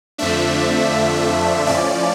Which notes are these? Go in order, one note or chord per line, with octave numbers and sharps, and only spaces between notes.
F2 D3 F3 A3 D4 E5
A2 F3 C#4 D5